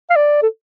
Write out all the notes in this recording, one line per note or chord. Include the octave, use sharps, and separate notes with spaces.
F5
D5
A4